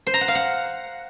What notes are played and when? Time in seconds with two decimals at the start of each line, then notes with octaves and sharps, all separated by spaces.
0.07 C5
0.14 A#5
0.21 F#5
0.28 F5
0.35 F#5